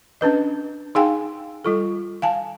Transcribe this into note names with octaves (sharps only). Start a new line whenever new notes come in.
C#4 D4 B4 D#5
D#4 G#4 F5 G5 G#5 C6
G3 F4 A4
F5 G#5 A5